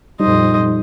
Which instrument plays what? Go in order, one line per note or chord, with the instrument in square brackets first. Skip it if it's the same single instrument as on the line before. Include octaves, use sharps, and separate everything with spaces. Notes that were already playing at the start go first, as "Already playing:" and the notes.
[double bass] F2 A#2 [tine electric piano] G3 D#4 [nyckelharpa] C5 D#5